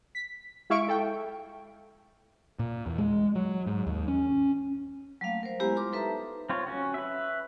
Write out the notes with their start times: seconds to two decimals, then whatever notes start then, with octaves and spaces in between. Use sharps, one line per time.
0.15 B6
0.70 G#3 E4 E5 F5 C#6 D7
0.88 A4 G5
2.59 A#2
2.86 E2
2.98 G#3
3.35 F#3
3.67 G#2
3.87 D#2
4.08 C#4
5.21 F#3 G3 A3 A#3 F5
5.43 A#4 C5
5.60 G#3 B3 E4 G4 C5 A#5
5.76 F4 A#4 C6 D6
5.92 D#4 A4 B4 E5 A5 A#5
6.49 C4 F4 C#5
6.67 C#4 F#4
6.94 B4 E5